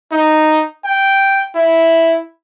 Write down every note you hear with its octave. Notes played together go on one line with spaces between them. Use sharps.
D#4
G5
E4